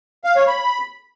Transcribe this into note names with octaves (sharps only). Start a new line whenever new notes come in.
F5
C#5
B5